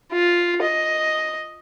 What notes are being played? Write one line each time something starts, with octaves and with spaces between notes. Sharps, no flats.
F4
D#5